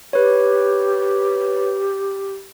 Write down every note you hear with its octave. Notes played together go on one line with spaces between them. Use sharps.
G4 B4 C#5